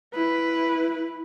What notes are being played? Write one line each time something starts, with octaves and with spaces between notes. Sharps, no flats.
E4 B4